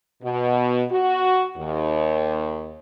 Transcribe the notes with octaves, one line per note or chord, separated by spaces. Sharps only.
B2
F#4
D#2